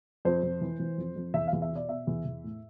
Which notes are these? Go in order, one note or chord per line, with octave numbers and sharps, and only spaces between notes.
F2 C5
F2
E3
E3
F2
F2
E2 E5
F5
E2
E5
B2 D5
B2 E5
E2
E2
A2